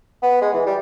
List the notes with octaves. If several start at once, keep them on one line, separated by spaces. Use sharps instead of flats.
B3
G#3
E3
G3